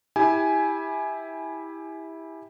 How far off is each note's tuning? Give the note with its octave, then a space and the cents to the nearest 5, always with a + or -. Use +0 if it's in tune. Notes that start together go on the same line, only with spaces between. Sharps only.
E4 -15 G4 +15 G#5 +10